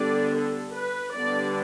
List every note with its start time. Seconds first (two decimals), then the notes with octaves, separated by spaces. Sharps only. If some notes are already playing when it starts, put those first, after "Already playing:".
Already playing: D3 G3 B3 D4 D5
0.36 A4
0.75 B4
1.15 D3 G3 B3 D4 D5